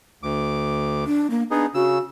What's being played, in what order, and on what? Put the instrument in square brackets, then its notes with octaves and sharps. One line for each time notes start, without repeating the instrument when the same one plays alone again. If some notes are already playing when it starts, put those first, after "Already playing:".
[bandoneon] D2 D6
[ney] D4
A#3
[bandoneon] B3 D#4 G#4 [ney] D4
[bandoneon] C#3 E6 [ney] F#4